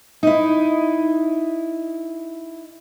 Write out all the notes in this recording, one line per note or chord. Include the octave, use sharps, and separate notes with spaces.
D#4 E4